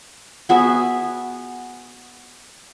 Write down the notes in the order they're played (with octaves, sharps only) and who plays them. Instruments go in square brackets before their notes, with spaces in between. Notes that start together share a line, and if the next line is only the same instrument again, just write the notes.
[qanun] B3 F#4 G#4 E5